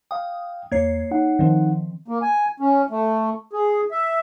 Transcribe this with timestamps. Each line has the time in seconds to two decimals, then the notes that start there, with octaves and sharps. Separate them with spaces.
0.11 F5 G5 D#6
0.72 E2 A#3 C#5 G#6 C7
1.11 D#4 F#5
1.39 D#3 F3 C4
2.08 A#3
2.22 G#5
2.60 C#4
2.90 A3
3.53 G#4
3.91 E5